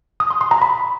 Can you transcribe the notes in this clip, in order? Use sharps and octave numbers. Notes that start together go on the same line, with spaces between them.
D#6
C6
C6
A#5
B5